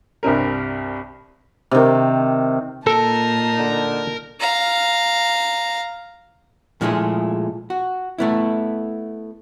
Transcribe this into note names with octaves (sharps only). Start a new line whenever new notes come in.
C2 G2 C4 A#4
C3 D#3
A#2 D#4 A4 A#4 A5
D3
F5 A#5
A#2 F3 G#3 A3 E4 G#4
F#4
A3 B3 E4